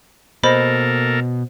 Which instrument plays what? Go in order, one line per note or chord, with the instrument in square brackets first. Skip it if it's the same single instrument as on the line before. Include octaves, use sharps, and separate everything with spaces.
[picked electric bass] B2 [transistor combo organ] A#3 A4 A#4 [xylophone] C5 D#5 B5